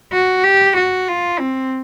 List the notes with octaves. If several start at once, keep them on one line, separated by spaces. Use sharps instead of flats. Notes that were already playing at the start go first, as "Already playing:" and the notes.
F#4
G4
F#4
F4
C4